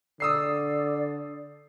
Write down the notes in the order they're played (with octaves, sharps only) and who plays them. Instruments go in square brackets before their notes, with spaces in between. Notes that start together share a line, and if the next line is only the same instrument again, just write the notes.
[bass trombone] D3 [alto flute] D5 [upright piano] D#6 E6 C7